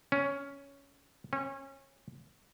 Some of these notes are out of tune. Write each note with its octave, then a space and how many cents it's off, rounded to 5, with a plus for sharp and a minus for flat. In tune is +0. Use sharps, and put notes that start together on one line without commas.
C#4 +10
C#4 -25